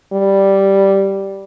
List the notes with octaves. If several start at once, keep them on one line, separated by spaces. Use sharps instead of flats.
G3